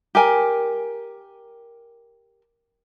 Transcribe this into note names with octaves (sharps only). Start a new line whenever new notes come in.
G4 A#4 G#5